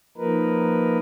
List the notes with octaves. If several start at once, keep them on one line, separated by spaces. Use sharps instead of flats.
F3 A#3 D#4 A#4 B4